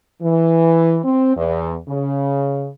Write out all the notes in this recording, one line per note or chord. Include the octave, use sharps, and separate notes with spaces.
E3
C4
E2
C#3